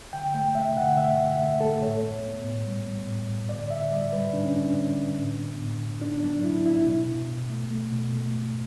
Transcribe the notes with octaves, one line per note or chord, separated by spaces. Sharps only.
D3 G5
A3 G5
A3 E5
D3 F#5
A3 E5
D3
A3 E5
A3 A4
A2 C#5
B3
B3
A2
G3
B3
A2
A2
D3 D5
D3 E5
G3 D5
G3 B4
D3 D4
C#4
D3 D4
D3
D3
A2
B3
A2
A2
B3 D4
F#3 D4
B3 E4
B3 E4
B2
B2
B2
A3
A3
B2
A3
B2